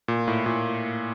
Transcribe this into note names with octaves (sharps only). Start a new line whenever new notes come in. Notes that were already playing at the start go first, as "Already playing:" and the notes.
A#2
A2
A#2